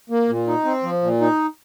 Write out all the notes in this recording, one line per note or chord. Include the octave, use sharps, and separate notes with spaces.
A#3
A#2
D#4
C4
F3
A#2
D#4